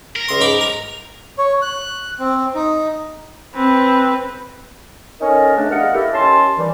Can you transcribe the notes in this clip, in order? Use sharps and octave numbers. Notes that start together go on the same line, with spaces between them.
A#4
C#2 C6
G#2 B5 D6
A#5
C#5
F#6
C4
D#4
C4 B4
C#4 D#4 A4 A#4
G#2 C#3 A3 D4
E2 G2 A#4 D#5 F5 F#5
A#3 E4 G4 A4 A#4
D#3 C#4 G4 A5 C6
D#2 E3 G3